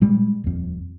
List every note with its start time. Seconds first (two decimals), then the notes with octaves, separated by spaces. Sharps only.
0.01 A#2 G3 G#3
0.44 D#1 F2